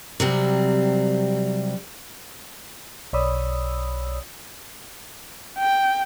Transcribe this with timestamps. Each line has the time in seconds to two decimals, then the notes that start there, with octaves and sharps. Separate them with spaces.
0.20 C3 F#3 G3 C4
3.13 B1 C#5 D5 B5 D#6 E6
5.59 G5